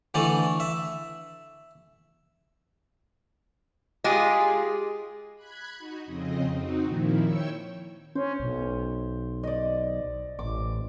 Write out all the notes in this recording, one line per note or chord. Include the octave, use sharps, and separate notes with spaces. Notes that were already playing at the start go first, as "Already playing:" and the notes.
D3 E3 A3 D5
E5
G#3 F4 G4 G#4
B5 F#6 G#6
D#4 F#4
F2 C#3 C4 D#5
C4 D#4 F#4
A#2 D#3 F3 E4
C#5 G5 C#6 E6
C#4 C5
B1
D5 D#5
A1 D6